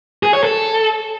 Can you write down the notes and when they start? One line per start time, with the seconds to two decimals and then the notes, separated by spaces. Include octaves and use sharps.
0.23 G#4
0.33 C#5
0.44 A4